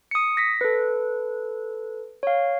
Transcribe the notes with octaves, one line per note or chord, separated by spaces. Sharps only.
D#6 C#7
A#6 B6
A4 B4
C#5 F5